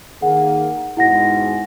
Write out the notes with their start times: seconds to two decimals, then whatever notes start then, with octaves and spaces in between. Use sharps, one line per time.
0.22 D#3 A#3 G#4 F#5
0.97 G#2 B2 G#3 E4 F#5 A#6